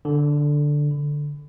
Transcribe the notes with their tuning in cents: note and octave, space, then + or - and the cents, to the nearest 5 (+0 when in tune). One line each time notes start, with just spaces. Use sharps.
D3 +0
D3 +0